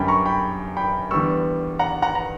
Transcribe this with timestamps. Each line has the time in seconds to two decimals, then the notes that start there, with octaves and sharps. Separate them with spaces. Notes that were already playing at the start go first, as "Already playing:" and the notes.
Already playing: F#2 D3 G3 C#4 G5 B5
0.08 A#5 C#6
0.25 G5 B5
0.77 G5 B5
1.11 E2 D3 G3 B3 C#6 E6
1.79 F#5 A#5
2.02 F#5 A#5
2.15 A#5